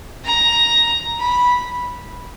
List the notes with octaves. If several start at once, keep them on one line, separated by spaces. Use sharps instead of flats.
A#5
B5